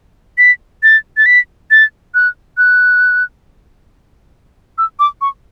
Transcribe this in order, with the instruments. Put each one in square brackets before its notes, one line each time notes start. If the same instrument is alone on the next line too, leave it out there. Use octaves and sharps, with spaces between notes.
[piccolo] B6
A6
A6
B6
A6
F#6
F#6
E6
D6
C#6